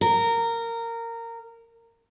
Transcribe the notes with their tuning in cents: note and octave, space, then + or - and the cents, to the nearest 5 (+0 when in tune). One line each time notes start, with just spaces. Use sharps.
A#4 -15